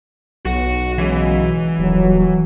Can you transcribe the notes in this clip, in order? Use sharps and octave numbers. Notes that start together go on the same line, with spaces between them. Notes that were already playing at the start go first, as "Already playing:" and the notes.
B1 F#4 F#5
C#3 E3 F#3 G#3
D#1 F#3